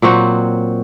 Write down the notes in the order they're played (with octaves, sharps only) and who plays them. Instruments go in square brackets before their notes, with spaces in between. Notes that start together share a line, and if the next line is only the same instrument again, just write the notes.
[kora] A#2 F#3 C4 F#4